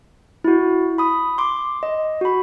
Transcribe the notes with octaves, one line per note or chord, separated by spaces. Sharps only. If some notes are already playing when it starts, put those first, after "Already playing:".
E4 F#4
B5 D#6
C6 D6
D#5
F#4 B5